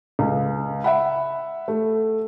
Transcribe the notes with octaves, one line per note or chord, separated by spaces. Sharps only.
C#2
E5 F#5 B5
A3